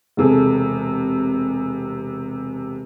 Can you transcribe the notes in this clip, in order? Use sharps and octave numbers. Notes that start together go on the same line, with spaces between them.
E1 C3 G#4 A4